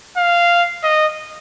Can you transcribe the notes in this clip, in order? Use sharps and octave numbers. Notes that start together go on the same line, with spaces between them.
F5
D#5